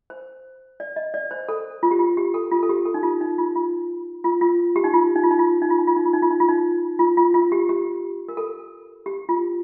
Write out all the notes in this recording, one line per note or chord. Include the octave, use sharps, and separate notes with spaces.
C5
D5
D#5
D5
C5
A4
F4
G4
F4
G4
A4
F4
A4
G4
A4
D#4
F4
D#4
F4
F4
F4
F4
G4
D#4
F4
D#4
F4
D#4
F4
D#4
F4
D#4
F4
D#4
F4
D#4
F4
D#4
F4
D#4
F4
F4
F4
G4
G4
A#4
A4
G4
F4